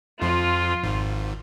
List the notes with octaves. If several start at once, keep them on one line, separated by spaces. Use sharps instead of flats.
F2 F3 F4
G#1 G#2